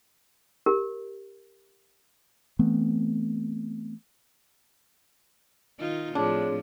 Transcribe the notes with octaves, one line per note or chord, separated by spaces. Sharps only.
G4 A#4
E3 A3 B3 C4
D#3 D#4 F4
A2 F3 C4 D4 G#4 C#5